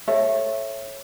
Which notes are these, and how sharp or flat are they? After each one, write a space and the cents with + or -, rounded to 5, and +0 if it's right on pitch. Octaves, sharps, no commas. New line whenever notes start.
A4 +0 C#5 -20 E5 +10